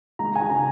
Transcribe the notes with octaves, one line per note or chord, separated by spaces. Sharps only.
G#3 A#5
G#5
C#3 A#5